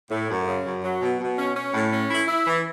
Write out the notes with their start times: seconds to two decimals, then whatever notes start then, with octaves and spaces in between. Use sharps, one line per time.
0.11 A2
0.29 F#2
0.47 C#3
0.65 F#2
0.83 F#3
1.02 B2
1.20 B2
1.38 C#4
1.56 C#4
1.74 A2
1.92 C#4
2.10 E4
2.27 E4
2.46 E3